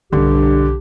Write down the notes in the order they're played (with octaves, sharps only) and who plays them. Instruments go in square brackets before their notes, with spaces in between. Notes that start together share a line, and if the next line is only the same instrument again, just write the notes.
[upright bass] B1 D4 [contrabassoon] G2 [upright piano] D3 [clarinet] G4